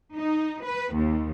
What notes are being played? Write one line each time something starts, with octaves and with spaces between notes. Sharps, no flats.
D#4
B4
D#2